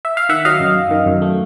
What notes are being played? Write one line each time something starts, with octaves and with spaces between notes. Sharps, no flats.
E5
F5
D#3 E5 F#5
F#3 D#5 F5
F#2
F#2
D#3
F#2
A3